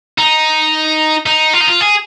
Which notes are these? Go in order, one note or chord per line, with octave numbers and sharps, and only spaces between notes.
D#4
D#4
F4
D#4
F4
G#4